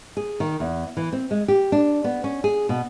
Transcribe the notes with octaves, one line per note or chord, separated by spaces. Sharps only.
G#4
D#3
E2
E3
C4
G#3
G4
D4
B3
C#4
G#4
B2